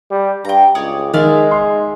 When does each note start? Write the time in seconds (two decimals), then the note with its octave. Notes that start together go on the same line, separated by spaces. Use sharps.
0.10 G3
0.45 G2 G5 A#5
0.75 C#2 C#5 D5 D#6
1.14 D#3 G#3 D5 E5 F5
1.51 C6